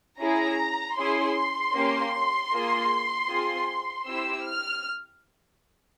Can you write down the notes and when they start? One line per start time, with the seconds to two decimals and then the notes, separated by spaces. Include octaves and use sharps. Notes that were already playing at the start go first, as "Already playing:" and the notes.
0.20 C#4 E4 G#4 A#5
0.97 C#4 E4 G#4 C6
1.74 A#3 C#4 G4
2.52 A#3 F4 G#4
3.28 C4 F4 G#4
4.06 C4 E4 G4 E6
4.45 F6